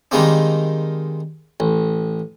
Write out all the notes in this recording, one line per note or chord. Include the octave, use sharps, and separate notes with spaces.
D#3 G3 G#3 A#3 C4 D4
A1